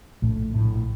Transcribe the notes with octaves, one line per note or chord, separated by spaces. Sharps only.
A#1 A2 A3
A#1 A2 A3